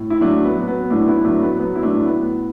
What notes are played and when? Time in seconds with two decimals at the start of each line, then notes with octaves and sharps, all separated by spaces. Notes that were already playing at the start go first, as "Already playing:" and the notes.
Already playing: A2
0.10 E4
0.21 F#3 A3 D4
0.44 B3
0.56 F#3
0.68 B3
0.90 A2 A3 D4
1.08 B3 E4
1.25 F#3 A3 D4
1.42 B3
1.59 F#3 B3
1.76 E4
1.83 A3 D4
1.94 A2
2.05 B3